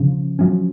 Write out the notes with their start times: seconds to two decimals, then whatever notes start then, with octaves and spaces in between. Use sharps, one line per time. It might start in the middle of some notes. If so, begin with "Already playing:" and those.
Already playing: C#3 F3
0.39 F3 F#3 C#4